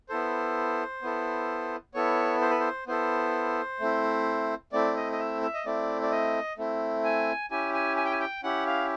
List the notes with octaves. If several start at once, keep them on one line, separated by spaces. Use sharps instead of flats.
B3 E4 A4 C5
B3 E4 A4
B3 E4 A4 C#5
C5
B4
C5
B3 E4 A4 C5
A3 C4 E4
A3 C4 E4 D5
D#5
D#5
E5
E5
D#5
A3 C4 E4 D5
D5
D#5
A3 C4 E4
G#5
C#4 E4 G4 G#5
G#5
G#5
G5
G#5
G5
C#4 E4 G4 F#5
F5